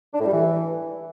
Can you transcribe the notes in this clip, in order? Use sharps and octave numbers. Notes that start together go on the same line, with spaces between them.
D4
A2
G3
E3